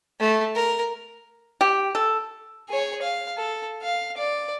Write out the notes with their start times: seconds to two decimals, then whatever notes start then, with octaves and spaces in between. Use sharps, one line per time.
0.20 A3
0.55 A#4
1.61 G4
1.95 A4
2.69 G#4 C#5
3.02 F5
3.37 A4
3.82 F5
4.18 D5